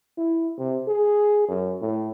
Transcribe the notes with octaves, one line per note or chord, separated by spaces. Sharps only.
E4
C3
G#4
F#2
A2